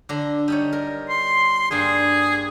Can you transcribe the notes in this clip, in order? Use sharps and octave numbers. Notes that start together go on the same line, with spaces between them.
D3 D4 A#5
G3 D#4 C#5
A#4
C6
G2 G3 A#3 G#4